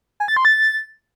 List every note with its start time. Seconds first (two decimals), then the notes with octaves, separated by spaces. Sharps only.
0.20 G#5
0.28 A6
0.37 C6
0.45 A6